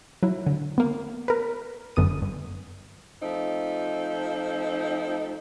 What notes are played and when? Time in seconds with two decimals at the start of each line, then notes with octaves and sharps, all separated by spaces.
0.23 F#3 E4
0.46 D3
0.78 A#3 B3
1.28 A#4 B4
1.96 G1 F#2 D3 B3 D#6 D#7
2.22 G2
3.21 F3 A3 C4 D#4